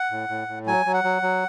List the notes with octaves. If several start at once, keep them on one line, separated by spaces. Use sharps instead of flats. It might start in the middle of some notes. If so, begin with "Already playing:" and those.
Already playing: F#5
A2
A2
A2
F#3 G#5
F#3
F#5
F#3
F#3